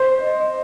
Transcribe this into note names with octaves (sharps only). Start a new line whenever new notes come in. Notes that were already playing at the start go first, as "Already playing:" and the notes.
Already playing: C5
D#5